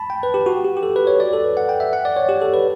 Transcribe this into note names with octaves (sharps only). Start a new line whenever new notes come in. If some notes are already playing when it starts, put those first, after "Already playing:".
Already playing: A5 B5
G5
B4
G4
F#4
G4
G4
A4
B4
C#5
D5
A4
B4
F#5
G5
E5
F#5
D5
C#5
G4
A4
B4